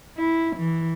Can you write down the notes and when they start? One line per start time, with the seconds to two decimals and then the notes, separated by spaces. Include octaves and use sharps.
0.17 E4
0.55 E3